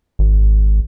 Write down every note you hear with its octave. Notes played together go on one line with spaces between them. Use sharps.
G#1